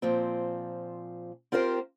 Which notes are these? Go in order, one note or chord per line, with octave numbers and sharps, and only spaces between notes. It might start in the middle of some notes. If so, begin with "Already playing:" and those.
A#2 F3 C4
C4 F4 G4 A#4 C5